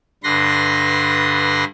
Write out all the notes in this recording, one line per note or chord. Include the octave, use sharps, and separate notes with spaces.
G2 D3 B4 C6 A#6